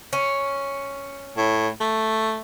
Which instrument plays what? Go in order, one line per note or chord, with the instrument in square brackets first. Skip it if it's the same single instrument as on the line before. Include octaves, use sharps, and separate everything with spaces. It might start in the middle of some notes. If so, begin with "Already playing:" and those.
[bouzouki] C#4
[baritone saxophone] A2
A3